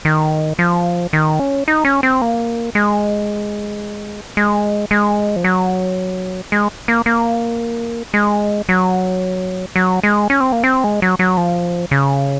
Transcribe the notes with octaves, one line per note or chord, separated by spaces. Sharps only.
D#3
F3
D#3
C#4
D#4
C#4
C4
A#3
G#3
G#3
G#3
F3
F#3
G#3
A#3
A#3
G#3
F#3
F#3
G#3
C#4
C4
A#3
C4
G#3
F#3
F#3
F3
C#3